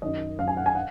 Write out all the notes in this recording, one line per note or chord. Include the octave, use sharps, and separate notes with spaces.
F#2 D#3 F#3 D#5
F#2 D#3 F#3 F5
G#5
F#5
G#5
F#5